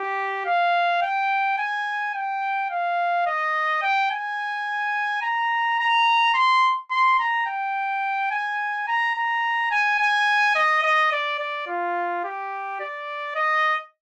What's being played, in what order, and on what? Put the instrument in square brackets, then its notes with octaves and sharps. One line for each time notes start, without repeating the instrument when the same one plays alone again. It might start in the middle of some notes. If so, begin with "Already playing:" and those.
Already playing: [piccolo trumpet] G4
F5
G5
G#5
G5
F5
D#5
G5
G#5
A#5
A#5
C6
C6
A#5
G5
G#5
A#5
A#5
G#5
G#5
D#5
D#5
D5
D5
F4
G4
D5
D#5